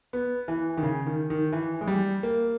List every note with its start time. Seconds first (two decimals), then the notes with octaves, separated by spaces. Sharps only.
0.13 B3
0.48 E3
0.77 D#3
0.83 C#3
1.06 D#3
1.30 D#3
1.53 E3
1.81 G#3
1.87 G3
2.23 A#3